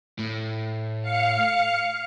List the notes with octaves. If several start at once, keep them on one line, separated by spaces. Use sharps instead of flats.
A2
F5 C#7